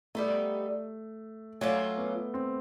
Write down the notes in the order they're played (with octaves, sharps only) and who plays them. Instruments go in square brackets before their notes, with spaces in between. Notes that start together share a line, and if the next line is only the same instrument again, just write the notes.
[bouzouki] G3 B3 D#4 [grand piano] A3
[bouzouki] F#3 A#3 C#4 F4 [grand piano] A3
[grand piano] B3
C4